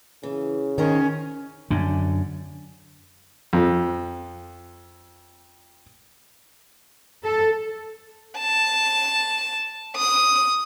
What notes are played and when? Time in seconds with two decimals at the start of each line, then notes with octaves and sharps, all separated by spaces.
0.23 C#3 E3
0.78 D#3 C#4 A#4 C5 D#5
1.71 F#2 D3
3.53 F2 F3
7.24 A4
8.39 A5
9.96 D#6